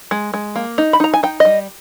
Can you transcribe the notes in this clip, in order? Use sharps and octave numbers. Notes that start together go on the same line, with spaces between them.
G#3
G#3
A#3
D#4
B5
D#4 A#5
G#5
D#4 G5
G3 D#5